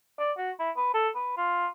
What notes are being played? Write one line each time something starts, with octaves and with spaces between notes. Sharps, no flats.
D5
F#4
E4
B4
A4
B4
F4